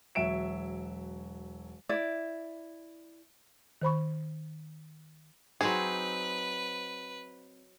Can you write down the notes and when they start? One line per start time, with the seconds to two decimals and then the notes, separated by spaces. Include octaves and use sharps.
0.15 E1 F#3 E5 D7 E7
1.89 E4 D5
3.82 D#3 C5 B5 C#6
5.61 F#3 C4 D#4 G#4 B4